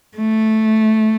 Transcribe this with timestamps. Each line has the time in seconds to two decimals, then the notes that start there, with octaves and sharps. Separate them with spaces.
0.17 A3